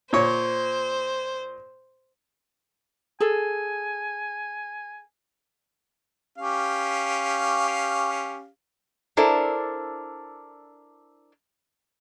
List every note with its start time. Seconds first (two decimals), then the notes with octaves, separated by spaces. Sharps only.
0.13 A#2 C5 C#5
3.20 G#4 A4 G#5
6.38 C#4 G4 F5
9.17 D4 E4 A4 A#4 C5 D5